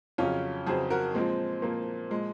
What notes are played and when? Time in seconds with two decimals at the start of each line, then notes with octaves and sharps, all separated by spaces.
0.18 F2 C#3 F#3 C#4 F4
0.66 F2 C#3 F#3 G#4 C5
0.90 F#4 A#4
1.15 A#2 F3 G#3 C4
1.62 A#2 F3 A#3
2.10 A#2 F3 G#3